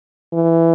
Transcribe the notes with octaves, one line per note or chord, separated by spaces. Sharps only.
E3